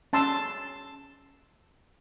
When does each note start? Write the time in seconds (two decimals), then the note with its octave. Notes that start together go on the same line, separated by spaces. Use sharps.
0.13 C#4 A5 C6 E6